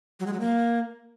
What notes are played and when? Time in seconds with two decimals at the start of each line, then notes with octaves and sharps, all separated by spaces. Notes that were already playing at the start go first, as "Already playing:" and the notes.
0.20 F#3
0.26 G#3
0.33 F#3
0.40 A#3